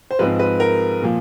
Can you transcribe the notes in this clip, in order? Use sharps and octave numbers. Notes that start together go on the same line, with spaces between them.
C5
G#2 F3 G#3 C4 B4
B4
A#4
A#2 F3